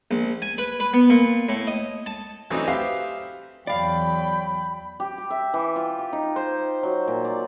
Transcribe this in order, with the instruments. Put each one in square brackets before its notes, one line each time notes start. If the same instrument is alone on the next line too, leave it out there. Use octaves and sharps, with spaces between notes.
[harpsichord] A#1
G#5
B4
B4
B3
A#2
A2
D#5
A5
[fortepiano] E3 F#3 A3 C4 D4 D#4
G4 B4 C5 E5 F5
[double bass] E2 F#3 [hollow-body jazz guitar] D5 F5 [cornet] G5 [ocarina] B5
[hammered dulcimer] G4
G4
E5
E3
F4
G4
D#4
C5
F#3
A#2
D5